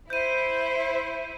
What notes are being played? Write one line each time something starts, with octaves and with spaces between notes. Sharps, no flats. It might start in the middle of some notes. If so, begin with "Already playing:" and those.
E4 C5 G6 D#7